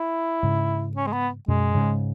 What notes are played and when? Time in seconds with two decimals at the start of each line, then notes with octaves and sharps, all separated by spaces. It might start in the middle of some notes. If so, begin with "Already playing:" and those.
Already playing: E4
0.43 G#2 C#3
0.96 C#4
1.07 G#3
1.12 B3
1.48 F#2 B2 G#3
1.74 G#2 C#3